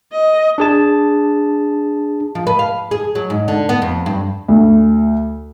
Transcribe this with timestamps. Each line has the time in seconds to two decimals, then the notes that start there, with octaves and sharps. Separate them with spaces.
0.12 D#5
0.58 D4 G#4 A5
2.35 F3
2.47 B4
2.59 F5
2.91 G#4
3.15 F#3
3.30 G#2
3.48 D3
3.69 B3
3.82 F2
4.06 G2
4.48 D2